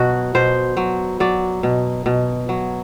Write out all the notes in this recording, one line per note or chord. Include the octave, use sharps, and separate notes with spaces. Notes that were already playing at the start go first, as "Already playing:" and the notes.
Already playing: B2 F#3 F#4
B2 C5
F#3
F#3 D5
B2
B2
F#3